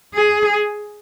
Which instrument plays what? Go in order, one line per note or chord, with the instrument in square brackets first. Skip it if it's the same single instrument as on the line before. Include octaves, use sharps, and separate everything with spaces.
[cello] G#4